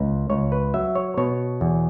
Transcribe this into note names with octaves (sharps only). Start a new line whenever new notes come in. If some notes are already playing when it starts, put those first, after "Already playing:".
Already playing: C#2
C#2 C#5
B4
F#3 E5
C#5
B2 C#5
E2